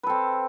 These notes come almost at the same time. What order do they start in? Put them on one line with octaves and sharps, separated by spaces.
B4 A4 C4